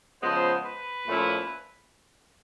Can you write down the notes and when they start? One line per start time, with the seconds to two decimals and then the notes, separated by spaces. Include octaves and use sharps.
0.22 C#3 F3 G#3 B3 C5
0.64 B4
1.06 A#2 F3 A3 C#4 E4